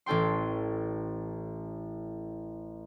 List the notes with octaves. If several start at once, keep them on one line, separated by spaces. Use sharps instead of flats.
A1 C#4 A4 G5 C6